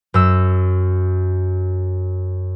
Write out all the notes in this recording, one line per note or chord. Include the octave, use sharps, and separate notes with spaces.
F#2 E6 E7